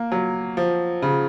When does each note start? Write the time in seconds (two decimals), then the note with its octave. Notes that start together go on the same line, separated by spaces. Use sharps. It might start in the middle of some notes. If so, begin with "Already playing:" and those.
Already playing: A#3
0.12 F#3
0.57 F3
1.02 C#3